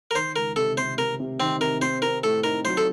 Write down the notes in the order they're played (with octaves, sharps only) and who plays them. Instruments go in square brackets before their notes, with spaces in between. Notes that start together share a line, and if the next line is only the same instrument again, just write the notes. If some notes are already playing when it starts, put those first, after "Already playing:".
[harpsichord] A#4
[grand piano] D#3 [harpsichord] C5
[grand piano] C#2 [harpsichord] A#4
[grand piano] C3 [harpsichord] A4
[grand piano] C3 [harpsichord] C5
[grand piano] C3 [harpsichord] A#4
[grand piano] C3
[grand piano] D#3 [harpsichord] C4
[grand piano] C3 [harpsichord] A#4
[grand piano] C4 [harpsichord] C5
[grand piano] C4 [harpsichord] A#4
[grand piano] A2 [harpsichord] A4
[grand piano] D#4 [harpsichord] A#4
[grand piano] F#3 [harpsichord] C5
[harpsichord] A4